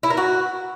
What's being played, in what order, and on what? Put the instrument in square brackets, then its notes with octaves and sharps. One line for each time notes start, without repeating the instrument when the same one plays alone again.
[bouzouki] E4
A#4
F#4